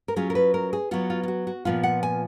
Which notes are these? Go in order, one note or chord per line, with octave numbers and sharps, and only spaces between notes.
A#4
F#3 C#4 F4 G#4
A#4
B4
A#4
G#4
F#3 B3 F4 F#4
F4
F4
F#4
F#4
A#2 F3 B3 F4 F5
F#5
G#5